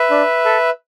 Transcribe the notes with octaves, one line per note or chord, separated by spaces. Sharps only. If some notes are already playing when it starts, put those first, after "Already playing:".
Already playing: B4 E5
D4
A4